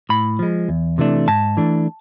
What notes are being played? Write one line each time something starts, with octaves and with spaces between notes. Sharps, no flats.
A2 B5
F3 G#3
E2
C3 E3 A3 D4
G#2 A5
E3 A3 D4